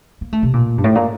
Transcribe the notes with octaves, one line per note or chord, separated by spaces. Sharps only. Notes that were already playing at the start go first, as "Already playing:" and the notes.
A#3
A3
C3
A#2
G2
A2
A#2